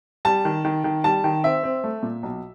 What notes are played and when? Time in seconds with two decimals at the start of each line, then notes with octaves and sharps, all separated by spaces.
0.25 G3 A5
0.45 D#3
0.65 D#3
0.84 D#3
1.04 G3 A5
1.24 D#3
1.44 C4 E5
1.63 C4
1.84 A3
2.03 A#2
2.23 B1